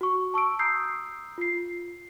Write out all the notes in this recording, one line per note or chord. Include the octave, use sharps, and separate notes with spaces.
F#4 C#6
A5 C#6 E6 D7
A#5 D#6 E6 G6 C7
F4 C7